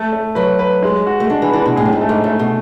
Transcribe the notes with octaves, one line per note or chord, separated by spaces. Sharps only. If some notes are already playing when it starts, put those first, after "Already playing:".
Already playing: A3
A3
F#3 B4
B4
G#3
F#4
A3
G#3 D4
E3
E3 D4
B2
A2 G#4
F#2
G#2
A3
G#2
G#2 A3
B2